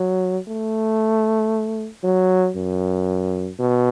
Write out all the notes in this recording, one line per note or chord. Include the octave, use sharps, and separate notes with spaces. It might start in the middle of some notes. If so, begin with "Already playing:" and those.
Already playing: F#3
A3
F#3
F#2
B2